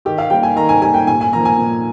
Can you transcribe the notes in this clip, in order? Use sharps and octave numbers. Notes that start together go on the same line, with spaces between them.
D#3 G4
F5
G3 A#3 G5
G#5
D#3 A#5
G#5
G3 A#3 G#5
G5
A#2 G#5
G#5
F3 A#3 A#5
G#5
A#2